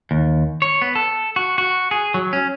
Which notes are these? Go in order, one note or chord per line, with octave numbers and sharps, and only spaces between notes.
D#2
C#5
B3
A4
F#4
F#4
G#4
F#3
C#4